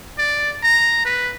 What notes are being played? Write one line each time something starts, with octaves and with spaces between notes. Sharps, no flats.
D5
A#5
B4